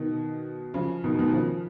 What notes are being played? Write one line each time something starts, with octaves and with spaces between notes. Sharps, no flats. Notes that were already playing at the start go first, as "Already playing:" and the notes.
Already playing: B2 D#3
C#3 F3
B2 D#3
B2 D#3
C#3 F3